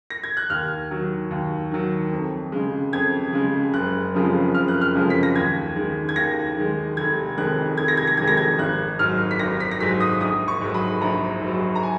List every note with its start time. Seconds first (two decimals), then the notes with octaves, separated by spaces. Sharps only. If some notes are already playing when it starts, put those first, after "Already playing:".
0.10 A#6
0.24 G#6
0.37 F#6
0.50 D#2 F6
0.91 D#3 F#3
1.31 D#2
1.72 D#3 F#3
2.12 F2
2.52 C#3 G#3
2.93 F2 G#6
3.33 C#3 G#3
3.73 F#1 F#6
4.14 F2 C#3 F3 G#3
4.54 F#1 F6
4.68 F#6
4.81 F6
4.95 F2 C#3 F3 G#3
5.10 B6
5.23 A#6
5.35 D#2 G#6
5.76 D#3 G#3
6.09 G#6
6.16 D#2 A#6
6.57 D#3 G#3
6.97 F1 G#6
7.38 F2 D#3 G#3 F#6
7.78 F1 G#6
7.88 A#6
7.97 G#6
8.07 A#6
8.17 F2 D#3 G#3 G#6
8.28 A#6
8.37 G#6
8.59 G#1 F#6
8.99 G#2 F#3 F6
9.31 B6
9.39 G#1 A#6
9.60 B6
9.71 A#6
9.80 G#2 F#3 B6
10.00 D#6
10.20 A#1 D#6
10.48 C#6
10.61 G#2 F#3
10.74 B5
11.01 A#1 A#5
11.42 G#2 F#3
11.75 A#5
11.83 G#5